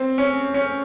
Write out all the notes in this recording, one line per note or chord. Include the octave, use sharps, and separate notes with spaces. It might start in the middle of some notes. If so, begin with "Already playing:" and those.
Already playing: C4
C#4
C#4